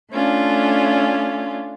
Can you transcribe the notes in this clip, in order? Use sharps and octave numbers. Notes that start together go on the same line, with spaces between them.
A3 C#4 D4 F4